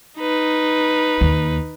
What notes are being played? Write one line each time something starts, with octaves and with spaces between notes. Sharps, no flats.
D#4 B4
D#2